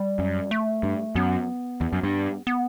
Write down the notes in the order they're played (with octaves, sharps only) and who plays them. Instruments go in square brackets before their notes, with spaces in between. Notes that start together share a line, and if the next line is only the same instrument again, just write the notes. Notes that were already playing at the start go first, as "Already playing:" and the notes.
Already playing: [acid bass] G3
[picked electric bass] F#2
[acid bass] A3
[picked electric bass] G2
[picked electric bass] F#2 [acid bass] B3
[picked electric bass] E2
F#2
G2
[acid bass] B3